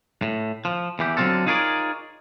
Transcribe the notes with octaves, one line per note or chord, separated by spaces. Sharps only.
A2
F3
E2 E3 G4
D3 F#3 C4 C#4 F4 A4
D#4 F4 G#4 A#4 C#5 D5